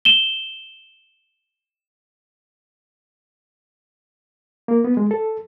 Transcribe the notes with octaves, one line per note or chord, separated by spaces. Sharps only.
E7 G7
A#3
B3
G#3
A4